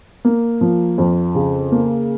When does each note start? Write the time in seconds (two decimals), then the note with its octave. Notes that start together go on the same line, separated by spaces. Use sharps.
0.25 A#3
0.61 F3
0.98 F2
1.35 C#3
1.72 A#3